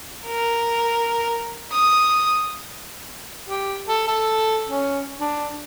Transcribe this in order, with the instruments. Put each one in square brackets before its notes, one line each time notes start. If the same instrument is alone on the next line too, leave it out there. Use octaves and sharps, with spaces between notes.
[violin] A#4
D#6
[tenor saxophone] G4
A4
A4
C#4
D4